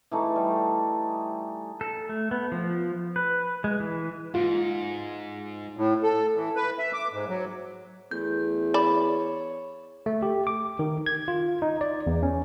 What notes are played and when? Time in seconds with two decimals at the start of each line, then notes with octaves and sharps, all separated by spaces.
0.11 E3 A3 D#4
0.36 G3
1.81 A4
2.09 A3
2.31 B3
2.52 F3
3.16 B4
3.64 G#3
3.80 E3
4.34 G#2 F4
5.77 A2
6.03 A4
6.36 E3
6.56 B4
6.79 E5
6.93 D6
7.13 G#2
7.29 F#3
8.11 E2 A3 G6
8.74 C#5 D5 B5
10.06 A3
10.22 G4
10.47 D6
10.79 D#3
11.06 G#6
11.28 F4
11.62 D#4
11.81 D5
12.07 E2
12.23 C#4